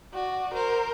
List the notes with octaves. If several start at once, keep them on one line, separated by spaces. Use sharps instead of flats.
F#4 D5
A#4 C5